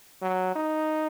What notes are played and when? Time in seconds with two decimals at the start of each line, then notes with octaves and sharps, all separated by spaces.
0.22 F#3
0.56 D#4